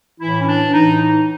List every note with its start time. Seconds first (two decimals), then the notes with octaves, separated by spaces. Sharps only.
0.20 A2 E3 E4
0.41 C#4
0.47 D4
0.73 A2 E3 D#4
1.01 D#4